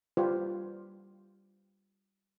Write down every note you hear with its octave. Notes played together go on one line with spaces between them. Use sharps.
G3 F4 G4 B4 C5 D5